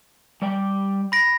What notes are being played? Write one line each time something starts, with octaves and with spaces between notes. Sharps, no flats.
G3 D5 G5
B5 A#6 D7